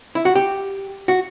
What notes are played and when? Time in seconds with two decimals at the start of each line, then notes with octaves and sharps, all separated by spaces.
0.15 E4
0.25 F#4
0.35 G4
1.08 F#4